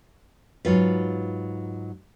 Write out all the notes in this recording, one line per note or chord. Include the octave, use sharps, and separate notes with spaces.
G#2 F#3 F4 B4